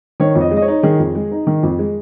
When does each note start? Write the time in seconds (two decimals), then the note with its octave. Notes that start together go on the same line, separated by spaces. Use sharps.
0.20 D#3 C#5
0.35 F2
0.41 D#5
0.51 G#3
0.57 D#5
0.62 C#5
0.68 D#4
0.83 D#3 G#4
0.99 F2
1.15 G#3
1.32 D#4
1.47 D#3
1.63 F2
1.79 G#3